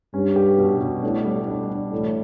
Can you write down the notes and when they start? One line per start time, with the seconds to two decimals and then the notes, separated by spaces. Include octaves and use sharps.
0.14 G2 C#4
0.36 G4
0.58 B2
0.81 B2
1.03 A2 D4
1.25 G3
1.47 D4
1.70 D4
1.92 A2 E3